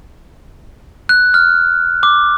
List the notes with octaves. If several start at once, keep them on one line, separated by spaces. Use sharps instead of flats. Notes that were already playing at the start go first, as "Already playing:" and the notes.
F#6
F6
D6